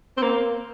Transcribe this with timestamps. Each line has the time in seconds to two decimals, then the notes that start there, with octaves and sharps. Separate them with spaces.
0.17 C4
0.22 A#3